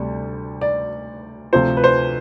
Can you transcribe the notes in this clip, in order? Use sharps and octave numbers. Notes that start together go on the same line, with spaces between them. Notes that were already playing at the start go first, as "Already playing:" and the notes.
Already playing: D2 C3 G3
D5
D2 C3 F3 C5
B4
C5